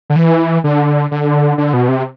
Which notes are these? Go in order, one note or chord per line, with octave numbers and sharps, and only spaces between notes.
D3
E3
D3
D3
D3
B2
C3